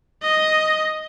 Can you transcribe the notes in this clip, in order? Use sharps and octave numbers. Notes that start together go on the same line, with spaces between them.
D#5